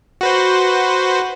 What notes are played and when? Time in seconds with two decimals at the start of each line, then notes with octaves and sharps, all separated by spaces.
0.21 F#4 B4 C5